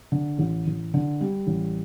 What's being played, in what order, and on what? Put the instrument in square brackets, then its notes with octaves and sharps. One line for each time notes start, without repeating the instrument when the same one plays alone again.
[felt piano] D3
A1
A1
D3
G3
A1